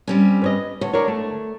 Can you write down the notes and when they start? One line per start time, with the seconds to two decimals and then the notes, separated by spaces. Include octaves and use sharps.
0.07 G3 C4 C#4
0.42 B4 C#5 D#5
0.81 D2 C#5
0.93 D4 A#4 C#5
1.08 A3